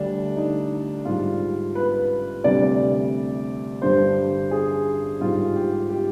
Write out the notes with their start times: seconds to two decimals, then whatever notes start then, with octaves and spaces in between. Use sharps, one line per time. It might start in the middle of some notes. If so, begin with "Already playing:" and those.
Already playing: D2 D3 G3 D4
0.36 D#4
1.05 G#2 G3 F4
1.75 B4
2.44 D2 C3 G3 D5
3.82 G2 D3 G3 C5
4.51 G#4
5.20 G#2 G3 F4
5.56 G4
5.90 G4